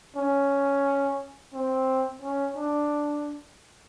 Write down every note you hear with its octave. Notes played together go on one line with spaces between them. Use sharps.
C#4
C4
C#4
D4